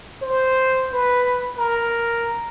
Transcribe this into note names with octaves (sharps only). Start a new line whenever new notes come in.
C5
B4
A#4